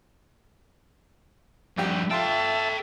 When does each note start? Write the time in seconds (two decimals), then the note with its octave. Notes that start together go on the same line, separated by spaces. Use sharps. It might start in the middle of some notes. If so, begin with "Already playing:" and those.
1.78 A#1 G2 F3 F#4 G4
2.11 F4 A4 E5 G5 A5 C6